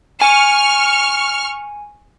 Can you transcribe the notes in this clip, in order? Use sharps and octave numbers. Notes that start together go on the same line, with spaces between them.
G#5 C#6 F6